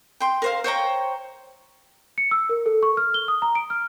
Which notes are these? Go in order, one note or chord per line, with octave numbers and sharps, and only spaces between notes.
G5 C6
A#4 C5 F5
C5 C#5 G5 A#5
C#7
E6
A#4
A4
C#6
F6
G7
D#6
A#5
D7
F6